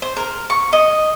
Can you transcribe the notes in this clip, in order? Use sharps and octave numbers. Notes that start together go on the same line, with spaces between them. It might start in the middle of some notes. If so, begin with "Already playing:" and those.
C5
A#4
C#6
D#5